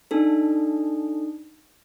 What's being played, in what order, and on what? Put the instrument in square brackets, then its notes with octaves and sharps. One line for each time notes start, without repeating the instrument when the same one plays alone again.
[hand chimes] D4 D#4 A4